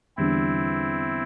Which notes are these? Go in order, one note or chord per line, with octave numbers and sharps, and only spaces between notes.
E2 D3 G3 C4 D4 E4